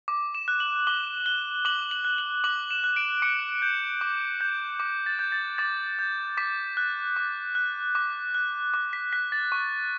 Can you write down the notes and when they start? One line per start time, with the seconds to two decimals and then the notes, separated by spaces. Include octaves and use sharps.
0.08 D6
0.35 E7
0.48 F#6
0.60 F#7
0.87 D6 G7
1.26 F#6 G7
1.65 D6 F#7
1.91 F#7
2.05 F#6
2.18 F#7
2.44 D6 F#7
2.71 E7
2.84 F#6
2.96 D7
3.22 D6 C#7
3.62 G6
4.01 D6
4.41 G6
4.80 D6
5.06 A6
5.19 G6
5.32 A6
5.58 D6 A6
5.99 G6
6.37 D6 B6
6.77 F#6
7.16 D6
7.55 F#6
7.95 D6
8.34 F#6
8.74 D6
8.93 B6
9.13 F#6 B6
9.32 A6
9.52 C#6